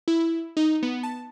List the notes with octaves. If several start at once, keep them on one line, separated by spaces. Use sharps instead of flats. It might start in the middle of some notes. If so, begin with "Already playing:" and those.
E4
D#4
B3
A5